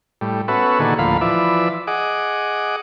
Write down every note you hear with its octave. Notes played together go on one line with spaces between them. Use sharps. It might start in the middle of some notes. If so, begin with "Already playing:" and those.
A2 G3
B3 C#4 F#4 A4 B4 E5
A#2 D3 D#3 F#4 G#4 A4
D2 A2 F3 A#3 F5 B5
E3 F3 B4 D5 E5
G#4 D#5 F#5 D6